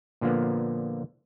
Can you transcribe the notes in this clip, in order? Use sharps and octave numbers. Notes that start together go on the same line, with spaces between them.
A#2 D3 F3 A#3 B3